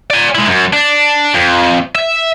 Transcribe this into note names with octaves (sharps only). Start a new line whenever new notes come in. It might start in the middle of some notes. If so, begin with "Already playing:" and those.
D5 G#5
G#3 E4
F#2
D4
F2
E5